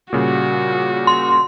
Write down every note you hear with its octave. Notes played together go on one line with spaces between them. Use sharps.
A#2 C#3 G3 F#4
C6